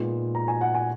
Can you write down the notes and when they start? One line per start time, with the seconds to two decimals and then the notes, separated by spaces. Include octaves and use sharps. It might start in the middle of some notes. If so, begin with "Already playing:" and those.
Already playing: A#2 G#3 B3 D#4
0.35 A#5
0.48 G#5
0.61 F#5
0.74 G#5